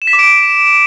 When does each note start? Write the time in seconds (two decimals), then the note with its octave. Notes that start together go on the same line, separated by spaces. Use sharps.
0.02 E7
0.07 B6
0.13 D6
0.19 D7